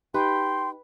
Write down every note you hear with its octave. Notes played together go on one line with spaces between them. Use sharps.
D#4 G4 B4 G5 C6